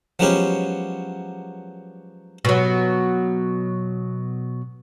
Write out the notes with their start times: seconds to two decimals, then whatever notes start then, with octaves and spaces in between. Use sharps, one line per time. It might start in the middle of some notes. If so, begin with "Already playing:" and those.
0.19 F3 F#3 G#3 B3 C#4 G4
2.45 B2 F#3